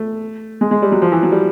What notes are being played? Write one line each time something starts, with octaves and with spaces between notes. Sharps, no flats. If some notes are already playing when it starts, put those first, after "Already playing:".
Already playing: A3
G#3
G#3
G3
F#3
F3
E3
F#3
G3